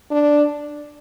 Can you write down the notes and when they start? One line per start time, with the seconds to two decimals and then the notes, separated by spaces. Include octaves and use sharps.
0.11 D4